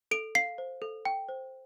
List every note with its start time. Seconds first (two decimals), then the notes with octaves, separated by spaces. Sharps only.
0.11 A4 D7
0.35 F5 C7
0.58 C5
0.82 A4
1.05 G5
1.29 C5